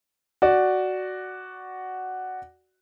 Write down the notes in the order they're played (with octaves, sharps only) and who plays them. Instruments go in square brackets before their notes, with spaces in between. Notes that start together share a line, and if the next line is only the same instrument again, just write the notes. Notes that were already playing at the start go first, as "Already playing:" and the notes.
[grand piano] F#4 D5